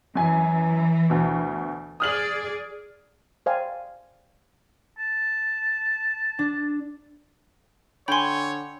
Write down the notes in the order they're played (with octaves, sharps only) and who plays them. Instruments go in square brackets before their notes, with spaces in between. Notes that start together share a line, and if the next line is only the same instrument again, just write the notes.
[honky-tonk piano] F#2 G#5 [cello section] E3
[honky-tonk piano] D2 B2
[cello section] G#4 D5 [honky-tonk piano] D#6 F6 F#7
[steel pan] C5 D5 F5 G5 G#5
[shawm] A5
[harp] D4
[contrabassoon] D3 [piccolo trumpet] C#5 [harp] G5 G#5 [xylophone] B5 C6